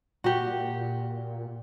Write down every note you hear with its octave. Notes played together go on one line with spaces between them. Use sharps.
A#2 F#4 G4